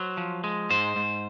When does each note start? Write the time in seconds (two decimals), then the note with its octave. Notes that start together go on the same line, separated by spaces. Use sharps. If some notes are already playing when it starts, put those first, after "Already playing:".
Already playing: F#3 C5
0.17 F3
0.44 G#3
0.70 G#2 C5
0.96 G#2